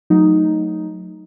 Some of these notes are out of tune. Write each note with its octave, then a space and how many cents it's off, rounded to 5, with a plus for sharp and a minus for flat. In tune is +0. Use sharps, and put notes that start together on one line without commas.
F#3 -15 A3 +0 D#4 +0